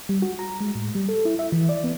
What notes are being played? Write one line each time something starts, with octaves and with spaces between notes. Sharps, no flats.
G3
F#4
A#5
G#3
A2
G3
A4
E4
E5
E3
D5
B3